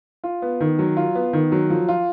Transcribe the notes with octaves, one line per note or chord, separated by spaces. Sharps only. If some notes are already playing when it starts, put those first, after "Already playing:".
F4
B3
D#3
F#3
F4
B3
D#3
F#3
F3
F4